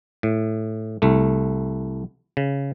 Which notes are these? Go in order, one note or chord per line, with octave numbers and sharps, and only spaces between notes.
A2
C2 A3
C#3